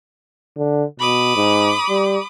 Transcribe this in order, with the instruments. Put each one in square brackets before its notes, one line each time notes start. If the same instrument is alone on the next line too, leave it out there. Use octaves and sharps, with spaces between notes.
[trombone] D3
[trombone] B2 [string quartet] B5 D6 D#6
[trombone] G#2
G3